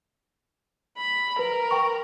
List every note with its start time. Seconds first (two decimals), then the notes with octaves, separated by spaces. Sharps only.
0.98 B5
1.39 A#4 B4
1.71 G5 C#6